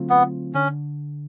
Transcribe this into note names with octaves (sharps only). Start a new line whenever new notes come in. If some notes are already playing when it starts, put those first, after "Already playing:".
Already playing: D3 F#3 A3 C4 F4
B3
D3 C#4